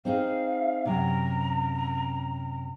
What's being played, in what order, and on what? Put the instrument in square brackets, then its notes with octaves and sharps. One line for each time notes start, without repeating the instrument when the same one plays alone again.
[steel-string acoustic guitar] C4 D#4 G#4 [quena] F5
[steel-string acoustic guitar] F#2 C3 [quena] A#5